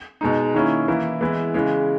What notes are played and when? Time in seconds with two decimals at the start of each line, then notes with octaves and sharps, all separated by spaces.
0.21 B2 G#3 D#4
0.54 D#3 A#3 C#4 E4
0.88 E3 A#3 E4
1.21 E3 G#3 B3 E4
1.54 C#3 E3 G#3